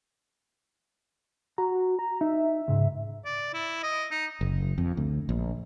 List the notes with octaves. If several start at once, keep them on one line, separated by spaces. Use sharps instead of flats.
F#4 A#5
A#5
D#4 E5
C#2 G#2
D5
E4
D#5
D#4
F#1
F2
D2
A#1